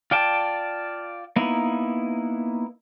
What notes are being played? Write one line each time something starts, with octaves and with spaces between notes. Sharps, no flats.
F4 D5 G5 A5
A#3 B3 D#4 E4